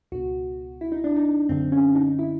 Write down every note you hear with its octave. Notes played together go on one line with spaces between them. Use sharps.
C#2 B2 F#4
E4
D#4
D4
D#4
F#2 D3 C4
C#4
D#4
E4